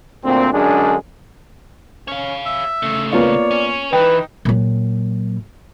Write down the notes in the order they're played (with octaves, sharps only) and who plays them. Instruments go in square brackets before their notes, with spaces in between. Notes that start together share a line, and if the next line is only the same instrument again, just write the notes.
[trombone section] D2 A#2 C4
F#2 D3 G#3 D4 G#4
[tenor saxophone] C#4 [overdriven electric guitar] C#5 F5
[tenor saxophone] E5
[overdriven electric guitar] C#3 A3
[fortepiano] A#3 B3 F4 [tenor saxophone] C#5 [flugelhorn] D5
[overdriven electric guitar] C#4
[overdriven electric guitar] E3 [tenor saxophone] D#4 [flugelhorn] B4 [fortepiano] G5
[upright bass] A#2 F#3